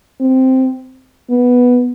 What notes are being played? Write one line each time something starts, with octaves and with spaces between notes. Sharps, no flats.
C4
B3